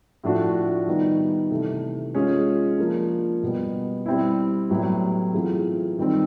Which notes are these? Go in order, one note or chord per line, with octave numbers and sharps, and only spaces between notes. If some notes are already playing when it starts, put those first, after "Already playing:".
A2 F3 A3 D4 F#4
D#3 G3 B3 D#4
C3 E3 A3
G#3 C#4 F4 G#4
F3 A#3 D4
B2 G3 B3
G3 C4 E4
A2 F#3 B3 E4 G4
E3 A3 C4 F4 G#4
D#3 G3 C4